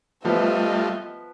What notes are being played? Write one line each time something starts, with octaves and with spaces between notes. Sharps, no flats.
F3 G3 A3 B3 F4 D#5 E5